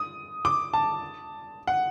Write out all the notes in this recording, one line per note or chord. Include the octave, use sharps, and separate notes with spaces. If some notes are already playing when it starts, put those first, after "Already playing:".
Already playing: D#6
D6
A5
F#5